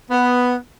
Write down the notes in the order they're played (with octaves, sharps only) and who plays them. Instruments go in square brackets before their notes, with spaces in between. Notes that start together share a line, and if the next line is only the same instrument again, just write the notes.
[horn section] B3